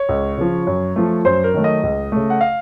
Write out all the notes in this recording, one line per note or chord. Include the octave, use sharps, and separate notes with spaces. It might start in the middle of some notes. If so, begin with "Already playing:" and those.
Already playing: C#5
C#2
C#3 F3
F#2
F3 A3
F#2 C5
A#4
D#3 F#3 A3
D#5
C#2
C#3 A3
F#5
F5